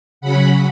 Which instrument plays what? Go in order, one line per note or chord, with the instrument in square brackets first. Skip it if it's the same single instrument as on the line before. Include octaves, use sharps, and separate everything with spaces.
[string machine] C#3 F#3 C#4 F#5 B5